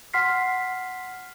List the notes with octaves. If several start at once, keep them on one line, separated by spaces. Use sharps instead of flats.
F#5 C6 F6 B6 C7